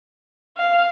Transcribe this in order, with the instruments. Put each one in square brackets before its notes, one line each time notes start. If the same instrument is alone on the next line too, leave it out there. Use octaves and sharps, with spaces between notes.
[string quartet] F5